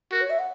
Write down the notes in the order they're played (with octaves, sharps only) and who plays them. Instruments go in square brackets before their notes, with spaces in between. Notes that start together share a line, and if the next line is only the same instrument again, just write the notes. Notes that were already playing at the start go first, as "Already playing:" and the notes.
[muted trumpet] F#4 [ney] A#4
[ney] C#5
E5
F#5